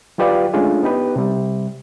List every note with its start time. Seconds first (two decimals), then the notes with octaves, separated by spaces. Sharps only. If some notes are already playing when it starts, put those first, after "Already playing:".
0.18 F#3 F4 G4 B4 D5 F5
0.53 G#3 A3 C#4 D4 F4 G#4
0.83 B3 D#4 G4 B4
1.16 C3 G3